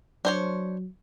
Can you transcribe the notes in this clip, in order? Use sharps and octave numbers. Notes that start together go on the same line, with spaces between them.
F#3 D4 C5 C#5